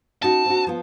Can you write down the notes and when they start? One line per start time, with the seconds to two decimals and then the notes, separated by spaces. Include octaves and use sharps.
0.22 C#4 D#4 F#4 A5
0.46 C4 D4 F#4
0.67 F3 B3 F4